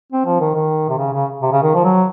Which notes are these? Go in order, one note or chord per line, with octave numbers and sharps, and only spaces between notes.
C4
F3
D#3
D#3
C3
C#3
C#3
C3
C#3
D#3
F3
F#3